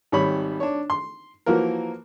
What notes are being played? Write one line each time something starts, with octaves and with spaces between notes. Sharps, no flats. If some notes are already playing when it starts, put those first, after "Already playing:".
G#1 G3 C#5 B5
D4 C#5
C6
E3 F3 A#3 F#4 A#4